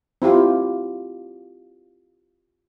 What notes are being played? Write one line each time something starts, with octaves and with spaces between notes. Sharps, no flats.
C4 E4 F4 G4